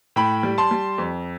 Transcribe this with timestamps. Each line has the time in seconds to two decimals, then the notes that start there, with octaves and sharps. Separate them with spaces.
0.16 A2 G5 B5
0.43 G3
0.58 A5 C6
0.71 G3
0.98 F2